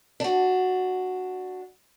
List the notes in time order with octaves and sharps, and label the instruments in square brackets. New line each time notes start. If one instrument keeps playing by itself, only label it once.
[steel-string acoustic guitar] D4 F#4